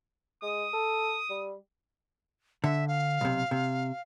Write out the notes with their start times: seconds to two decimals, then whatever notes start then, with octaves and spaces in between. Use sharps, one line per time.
0.42 G#3 D#6
0.73 A4
1.30 G3
2.64 D3 E5
2.88 F5
3.21 B1 C3
3.51 C3